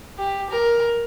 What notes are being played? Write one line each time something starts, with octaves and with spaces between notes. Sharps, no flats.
G4
A#4